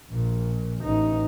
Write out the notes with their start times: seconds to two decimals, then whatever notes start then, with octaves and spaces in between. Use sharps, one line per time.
0.10 A#1 A#2
0.83 A1 D#4